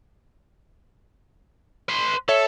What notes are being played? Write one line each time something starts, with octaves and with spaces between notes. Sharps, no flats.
B4 C6
A4 C#5 E5